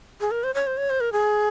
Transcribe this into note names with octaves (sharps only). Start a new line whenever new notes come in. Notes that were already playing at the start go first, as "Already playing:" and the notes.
G#4
A#4
C5
C#5
C5
C#5
C5
A#4
G#4